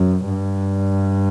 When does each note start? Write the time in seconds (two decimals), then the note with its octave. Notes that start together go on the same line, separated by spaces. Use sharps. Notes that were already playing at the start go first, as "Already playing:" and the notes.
Already playing: F#2
0.30 G2